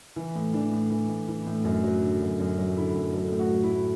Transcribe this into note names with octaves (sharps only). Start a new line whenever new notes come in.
E3
A2
E3 D4
A2
E3
A2
E3
A2
F#2
F#3
D3
F#2
F#2
F#3
D3 E4
F#2
F#3 A4
A2
F#4
F#3
E4
A2